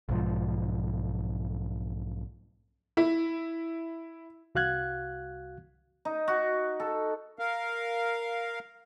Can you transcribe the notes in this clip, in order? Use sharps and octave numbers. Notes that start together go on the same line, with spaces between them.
B1 G#2 F3
E4
C2 F#4 F5 F#6 G#6
D#4
F#4
A4
A#4 F5